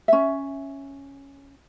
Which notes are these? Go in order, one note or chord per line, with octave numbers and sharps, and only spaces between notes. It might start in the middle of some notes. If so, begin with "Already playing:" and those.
C#4 E5